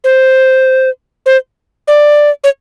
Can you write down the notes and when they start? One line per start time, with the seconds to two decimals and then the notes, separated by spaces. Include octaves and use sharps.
0.04 C5
1.26 C5
1.88 D5
2.44 C#5